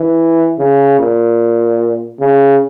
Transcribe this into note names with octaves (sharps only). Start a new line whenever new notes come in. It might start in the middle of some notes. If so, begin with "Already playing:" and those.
Already playing: E3
C#3
A#2
C#3